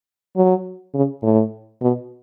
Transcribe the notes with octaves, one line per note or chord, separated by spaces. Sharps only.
F#3
C#3
A2
B2